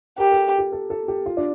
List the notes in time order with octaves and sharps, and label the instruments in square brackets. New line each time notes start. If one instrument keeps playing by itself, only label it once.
[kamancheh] G4 [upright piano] A#4
[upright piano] A4
G4
A4
A4
G4
F4
D4